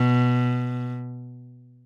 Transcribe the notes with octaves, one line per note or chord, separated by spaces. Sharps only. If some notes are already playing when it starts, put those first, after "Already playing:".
Already playing: B2